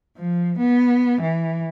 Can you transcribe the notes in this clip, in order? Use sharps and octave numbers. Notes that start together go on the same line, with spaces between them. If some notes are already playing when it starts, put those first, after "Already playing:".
F3
B3
E3